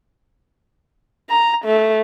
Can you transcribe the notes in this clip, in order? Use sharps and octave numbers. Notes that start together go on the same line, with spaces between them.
A#5
A3